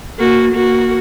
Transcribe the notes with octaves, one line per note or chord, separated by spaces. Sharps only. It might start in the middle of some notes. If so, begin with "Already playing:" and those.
A#3 F#4
A#3 F#4